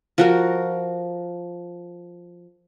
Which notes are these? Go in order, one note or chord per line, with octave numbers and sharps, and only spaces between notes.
F3 F#4 A#4